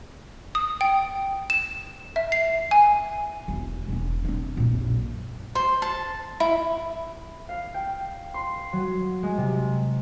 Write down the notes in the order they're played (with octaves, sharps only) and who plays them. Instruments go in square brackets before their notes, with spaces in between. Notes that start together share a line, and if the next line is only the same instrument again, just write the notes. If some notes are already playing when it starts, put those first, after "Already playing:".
[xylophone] D#6
G5
E7
E5
C7
G#5
[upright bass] E1 E4
E1 B3
C4 D4
A#2 D#4
A#1 F#2
[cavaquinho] C5
A5
E4
[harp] F5
G5
C6
F#3
G#3
C3